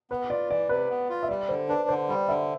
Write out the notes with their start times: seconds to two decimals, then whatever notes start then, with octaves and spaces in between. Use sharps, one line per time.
0.11 B3 B4
0.30 F4 D5
0.50 E3 D5
0.69 C3 B4
0.89 B3
1.09 F4
1.23 E5
1.29 G3 D5
1.49 D3 C5
1.69 D4 B4
1.89 D3 C5
2.08 G3 D5
2.28 D3 E5